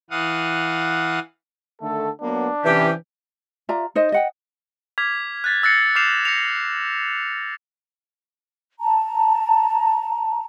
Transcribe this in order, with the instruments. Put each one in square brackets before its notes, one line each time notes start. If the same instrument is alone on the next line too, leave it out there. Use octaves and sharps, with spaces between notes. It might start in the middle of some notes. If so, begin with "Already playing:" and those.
[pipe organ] E3 F5 F#5 D#6
[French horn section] D3 D#3 A3 [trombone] A4
[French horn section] F#3 A#3 B3 [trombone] D4
[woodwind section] C3 C#4 G4 [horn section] E3 [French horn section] B4
[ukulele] F4 D5 E5 A#5
D#4 C5 D#5
D#5 F#5 G5
[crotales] D6 F6 G#6 B6 F7
F#6 A6 B6
E6 F#6 A6 A#6 C7 C#7
D6 F6 G6 C7 E7 F7
A#6 C#7 F7
[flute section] A5 A#5